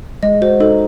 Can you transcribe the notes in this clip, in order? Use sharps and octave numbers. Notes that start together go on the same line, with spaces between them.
G#3 D#5
F#4 C5
D#4 A4